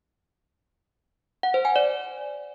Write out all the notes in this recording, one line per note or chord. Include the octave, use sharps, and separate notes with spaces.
F#5
C5
G#5
D5